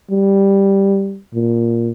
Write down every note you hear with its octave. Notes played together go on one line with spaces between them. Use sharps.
G3
A#2